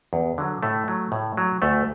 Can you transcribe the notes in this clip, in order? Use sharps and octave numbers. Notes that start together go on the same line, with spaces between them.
E2
D3 F#3
A2 A3
F#3
A2
F#3
D2 A3